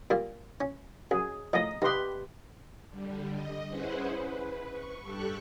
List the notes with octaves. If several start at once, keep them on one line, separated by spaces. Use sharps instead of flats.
A#2 G3 A#3
C#4
F#2 G#4
A2 F3 D#5
D#4 G4 B4 D#5 C6
D3 G3
D#5
C#4 E4 G#4 B4 C5 F#5
B4
C#6
G2 G4 A4 C#6 F#6